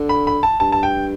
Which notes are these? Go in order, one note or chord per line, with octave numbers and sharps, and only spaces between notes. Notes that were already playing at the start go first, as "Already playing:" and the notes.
Already playing: D3
B5
B5
A5
G2 A5
A5
G5